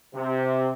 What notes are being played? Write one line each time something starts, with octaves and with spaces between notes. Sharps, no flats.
C3